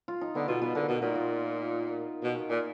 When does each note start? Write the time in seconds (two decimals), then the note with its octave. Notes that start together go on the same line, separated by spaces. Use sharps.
0.08 F4
0.21 D#4
0.35 D3 B3
0.48 B2 F4
0.61 B2 B4
0.75 D3 A#4
0.88 B2 F#4
1.01 A#2 D#4
1.15 F4
2.23 B2
2.36 A#4
2.49 A#2 G#4